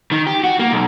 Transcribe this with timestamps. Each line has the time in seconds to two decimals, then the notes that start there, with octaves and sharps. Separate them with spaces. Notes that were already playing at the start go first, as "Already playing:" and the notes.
0.12 D#3
0.27 G4
0.44 F#4
0.59 A#3
0.72 B1